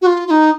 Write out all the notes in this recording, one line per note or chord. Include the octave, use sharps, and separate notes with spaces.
F#4
F4
F4
D#4